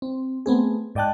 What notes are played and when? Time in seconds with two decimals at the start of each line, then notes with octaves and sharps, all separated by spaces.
0.02 C4
0.46 A3 B3 C4 G#4
0.95 G#2 D5 D#5 G5 A5 F#6